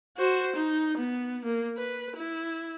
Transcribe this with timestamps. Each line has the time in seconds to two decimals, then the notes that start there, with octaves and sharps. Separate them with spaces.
0.17 F#4 C5
0.56 D#4
0.97 B3
1.45 A#3
1.78 B4
2.17 E4